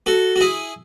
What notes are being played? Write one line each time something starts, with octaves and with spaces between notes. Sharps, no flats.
F#4 A4
F#4
E4 G#4